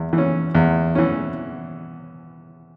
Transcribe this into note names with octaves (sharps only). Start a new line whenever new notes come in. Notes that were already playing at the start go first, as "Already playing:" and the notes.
Already playing: E2
E3
C#4
E2
E3 C#4